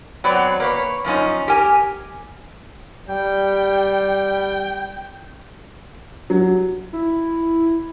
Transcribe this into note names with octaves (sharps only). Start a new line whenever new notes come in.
F#3 B3 C4 D5
A#3 B4 C#5
F#2 F3 C#4 D#4
G4 A#4 G#5
G3 G5
F#3
E4